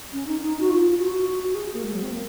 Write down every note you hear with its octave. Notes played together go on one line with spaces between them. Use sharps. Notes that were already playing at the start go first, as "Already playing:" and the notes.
C#4
D#4
D#4
F#4
F4
F#4
F#4
F#4
G#4
A#3
G#3
F#3
C4
A#3